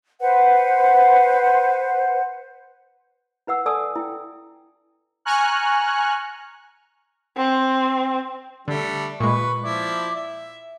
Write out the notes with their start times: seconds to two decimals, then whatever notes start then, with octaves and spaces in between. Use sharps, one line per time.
0.21 B4 C5 F#5
3.47 E4 B4 F#5 E6
3.66 A4 D5 G#5 A5 D#6 E6
3.96 E4 G5
5.25 G#5 A#5 C#6 F6 F#6
7.36 C4
8.68 D3 G3 A3 D4
9.20 A#2 G#3 B4 C#6
9.63 F3 E4 D5
10.16 E5